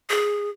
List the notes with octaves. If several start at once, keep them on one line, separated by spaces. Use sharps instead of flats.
G#4